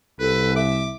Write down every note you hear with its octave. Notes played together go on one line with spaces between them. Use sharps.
C2 A4 B4
E5 D6